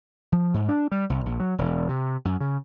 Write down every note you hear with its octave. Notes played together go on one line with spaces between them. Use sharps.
F3
G#2
D4
G3
C2
A#1
F#3
E1
C3
F#2
C#3